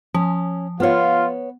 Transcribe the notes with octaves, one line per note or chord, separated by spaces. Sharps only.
F3 C#4
B3 F4 C#5